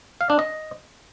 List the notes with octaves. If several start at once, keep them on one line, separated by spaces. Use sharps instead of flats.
F5
D4
D#5